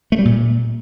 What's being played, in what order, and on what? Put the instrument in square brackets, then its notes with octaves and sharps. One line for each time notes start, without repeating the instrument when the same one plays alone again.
[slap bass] A3
G3
A#2